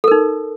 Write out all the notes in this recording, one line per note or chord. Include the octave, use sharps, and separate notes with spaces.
D#4 A4 A#4